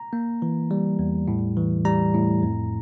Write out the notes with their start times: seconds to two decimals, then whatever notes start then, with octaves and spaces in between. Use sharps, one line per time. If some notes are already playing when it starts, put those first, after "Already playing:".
Already playing: A#5
0.13 A#3
0.42 E3
0.71 G3
0.99 E2
1.28 A2
1.57 E3
1.85 G3 A#5
2.14 A2
2.42 F2